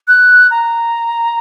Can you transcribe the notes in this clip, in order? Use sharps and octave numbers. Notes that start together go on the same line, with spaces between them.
F#6
A#5